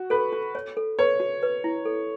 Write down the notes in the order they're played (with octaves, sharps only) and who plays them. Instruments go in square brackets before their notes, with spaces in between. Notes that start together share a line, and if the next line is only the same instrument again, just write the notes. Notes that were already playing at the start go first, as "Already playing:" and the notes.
Already playing: [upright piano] F#4
[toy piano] A4 [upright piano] B4
[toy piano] F#4
C#5
A4
[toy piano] B4 [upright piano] C#5
[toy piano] F#4
B4
E4
A4